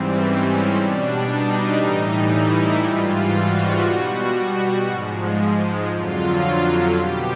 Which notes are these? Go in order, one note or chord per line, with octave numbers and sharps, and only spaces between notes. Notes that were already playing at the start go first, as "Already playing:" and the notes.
Already playing: G#2 E3 G3 C4
C#4
B2 G3 D4
D#4
A2 E3 G3
E4
G#2 E3 G3 F4
F#4
B2 G3 F#4
G#2 F3 G#3
F2 D3 F#3 F4
B2 G3 G4